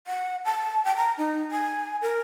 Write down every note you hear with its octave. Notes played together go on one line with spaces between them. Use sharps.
F#5
A5
G5
A#5
D#4
G#5
A#4